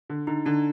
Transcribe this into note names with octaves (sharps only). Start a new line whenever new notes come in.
D3
D3 D#4
D3 D4